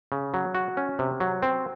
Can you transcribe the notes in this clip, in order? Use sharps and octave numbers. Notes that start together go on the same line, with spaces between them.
C#3
F#3
F#4
C#4
C3
F#3
C4